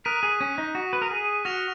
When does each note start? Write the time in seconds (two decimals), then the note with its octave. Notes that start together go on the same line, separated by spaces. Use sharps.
0.05 A#4 D#6 F#6 B6 D#7
0.23 G#4
0.41 C#4
0.58 D#4
0.75 F#4
0.93 B4
1.02 A#4
1.11 G#4
1.45 F#4 F6 A#6 F7